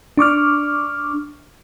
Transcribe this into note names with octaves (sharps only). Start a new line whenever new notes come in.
D4 C#6 D6 F6